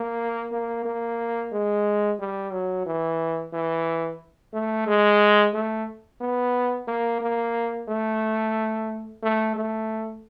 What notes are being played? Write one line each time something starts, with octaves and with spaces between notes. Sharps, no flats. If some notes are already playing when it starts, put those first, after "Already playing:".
Already playing: A#3
A#3
A#3
G#3
G3
F#3
E3
E3
A3
G#3
A3
B3
A#3
A#3
A3
A3
A3